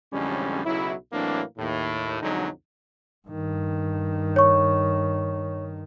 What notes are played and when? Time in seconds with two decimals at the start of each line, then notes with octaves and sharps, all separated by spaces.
0.12 A1 F2 D3 G3 G#3 C#4
0.65 B1 C#3 F#3 E4
1.12 A2 E3 F#3 A#3 C4 D4
1.58 D#2 A2
2.22 B1 F2 D3 F#3 G#3 D#4
3.28 G2 D#3
4.36 C#5 C#6